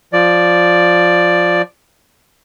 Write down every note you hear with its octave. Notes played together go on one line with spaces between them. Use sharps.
F3 D5